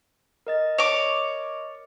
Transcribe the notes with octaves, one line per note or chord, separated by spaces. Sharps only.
A#4 D#5 A6
C#5 D6